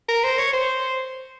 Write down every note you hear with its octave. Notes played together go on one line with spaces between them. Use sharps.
A#4
C5
C#5
C5